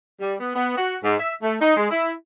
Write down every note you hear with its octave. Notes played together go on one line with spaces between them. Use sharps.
G3
B3
B3
F#4
G#2
E5
A3
D#4
G#3
E4